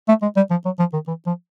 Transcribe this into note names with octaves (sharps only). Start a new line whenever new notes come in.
A3
G#3
G3
F3
F#3
F3
D#3
E3
F3